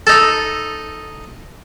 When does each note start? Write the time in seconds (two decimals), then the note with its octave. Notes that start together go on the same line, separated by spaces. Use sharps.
0.07 D#4 A4